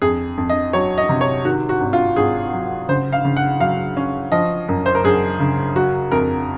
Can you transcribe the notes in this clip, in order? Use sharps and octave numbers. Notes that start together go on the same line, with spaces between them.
F2 G#4
F2
D#5
F#3 C#5
D#5
C3
C#5
D#3 F#4
F#4
G#1
F4
G#1 G#4
F#3
C#3 C5
F5
C#3
F#5
F#3 F5
C#4
F3 D#5
F#2
C5
A#4
F#2 G#4
C#3
F#3 F#4
F2 A#4